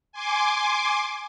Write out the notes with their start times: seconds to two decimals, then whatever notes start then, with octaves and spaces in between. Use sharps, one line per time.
0.12 G#5 C6 D6